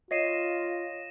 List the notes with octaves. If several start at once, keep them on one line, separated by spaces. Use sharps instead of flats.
F4 C#5 D#5 A#6 C7 D#7 E7